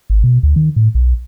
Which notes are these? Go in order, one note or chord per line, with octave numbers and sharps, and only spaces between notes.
G#1
B2
D2
D#3
A2
B1